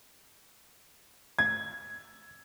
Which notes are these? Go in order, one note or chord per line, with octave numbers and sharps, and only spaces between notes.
G#6